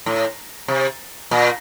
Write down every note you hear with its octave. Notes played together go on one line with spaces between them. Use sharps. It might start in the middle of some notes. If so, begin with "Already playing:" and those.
A2
C3
A#2